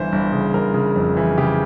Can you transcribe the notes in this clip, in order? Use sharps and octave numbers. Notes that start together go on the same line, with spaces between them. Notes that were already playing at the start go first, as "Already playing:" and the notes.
Already playing: G1 E3 C5
G1
C#3
G1 A#4
C#3
F2
E3
C#3 G4